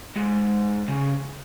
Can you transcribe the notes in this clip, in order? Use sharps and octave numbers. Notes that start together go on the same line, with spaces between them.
G#2
C#3